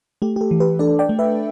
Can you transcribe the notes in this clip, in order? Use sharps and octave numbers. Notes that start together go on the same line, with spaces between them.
A3 G4
G4
A4
E3
G4 B4
D4 A4 D5
D5 G5
A3
B4 E5